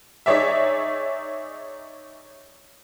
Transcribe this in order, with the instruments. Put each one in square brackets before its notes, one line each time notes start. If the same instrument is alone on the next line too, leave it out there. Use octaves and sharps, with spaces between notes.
[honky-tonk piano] D#4 G#4 C#5 D5 E5